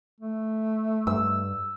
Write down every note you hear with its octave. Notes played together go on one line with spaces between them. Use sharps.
A3
G2 E6